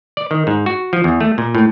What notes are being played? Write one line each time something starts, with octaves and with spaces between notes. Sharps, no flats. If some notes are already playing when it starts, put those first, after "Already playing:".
D5
D#3
G#2
F#4
F3
E2
A3
A#2
A2